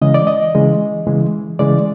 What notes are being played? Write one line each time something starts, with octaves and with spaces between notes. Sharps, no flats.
C#3 E3 G#3 D#5
D5
D#5
C#3 E3 G#3
C#3 E3 G#3
C#3 E3 G#3 D5